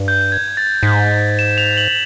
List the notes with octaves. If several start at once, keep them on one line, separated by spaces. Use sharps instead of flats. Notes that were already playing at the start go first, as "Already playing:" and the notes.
Already playing: G2
G6
G#6
A6
G#2 B6
E7
F7
F#7